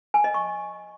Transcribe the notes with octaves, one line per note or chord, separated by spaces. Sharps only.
G#5
D#5
C#6